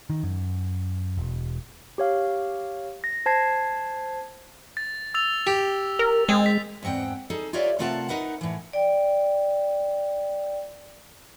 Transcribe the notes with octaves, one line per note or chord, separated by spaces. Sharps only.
D#3
F#2
E1
G4 C#5 F5
A#6
C5 A5 G#6 C7
A6
E6 A6 F7
G4
A#4
G#3 C4
B6
E2 G#2 C4 F#5 G5
D#4 G#4 A4
F4 G4 A#4 C#5 D5 E5
C3 A3 F4 A#4 F#5 A5
D#4 A#4 B4 F#5
A2 E3
D5 G5